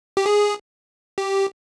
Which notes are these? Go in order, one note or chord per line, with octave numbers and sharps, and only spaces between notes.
G4
G#4
G4